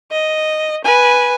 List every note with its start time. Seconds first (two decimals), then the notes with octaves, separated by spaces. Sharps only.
0.11 D#5
0.85 B4 G#5